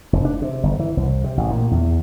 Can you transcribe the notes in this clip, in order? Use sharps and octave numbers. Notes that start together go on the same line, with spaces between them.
F1
D4
C3
G1
E3
C2
C3
A1
A#2
E2